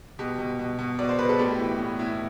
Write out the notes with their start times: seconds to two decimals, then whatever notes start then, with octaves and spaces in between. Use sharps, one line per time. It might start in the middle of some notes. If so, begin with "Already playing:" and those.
0.19 B2 G4
0.39 B2
0.59 B2
0.79 B2
0.99 B2 D5
1.09 C5
1.19 B2 B4
1.29 A4
1.39 A2 G4
1.59 E3
1.79 A2
1.99 A2 E4